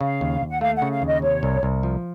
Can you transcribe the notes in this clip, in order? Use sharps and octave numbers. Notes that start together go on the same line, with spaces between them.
C#3 F5
D#2
D#2
F#5
A3 F5
F#5
C#3
F5
D#2
D#5
C3 C#5
C2
C2
F3